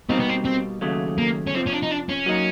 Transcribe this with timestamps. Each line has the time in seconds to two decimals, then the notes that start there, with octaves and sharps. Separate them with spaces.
0.09 B2 G3 A#3 C4 D#4 G4
0.19 B3
0.29 C4
0.45 C4
0.81 D#2 C#3 F#3 A3
1.18 A#3
1.47 C#4
1.54 F2 C3 F3 C4
1.66 C#4
1.72 D4
1.82 D#4
1.91 D4
2.09 C#4
2.26 F#3 A#3 D#4